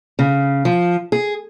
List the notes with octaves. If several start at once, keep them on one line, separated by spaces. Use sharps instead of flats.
C#3
F3
G#4